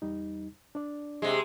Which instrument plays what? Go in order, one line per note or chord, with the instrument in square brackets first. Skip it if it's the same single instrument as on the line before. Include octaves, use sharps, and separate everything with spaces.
[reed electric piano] E2 G3 D#4
D4 D5
[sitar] C3 G#3